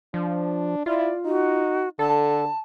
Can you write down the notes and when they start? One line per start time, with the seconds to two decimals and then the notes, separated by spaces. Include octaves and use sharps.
0.14 F3 D4
0.86 E4 F4 D5
1.25 D#4 F#4
1.99 D3 A4 A5